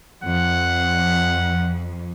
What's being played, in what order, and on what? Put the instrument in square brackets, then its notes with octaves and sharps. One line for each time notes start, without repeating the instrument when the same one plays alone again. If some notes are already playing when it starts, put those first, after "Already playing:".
[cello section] F2 [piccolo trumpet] F#5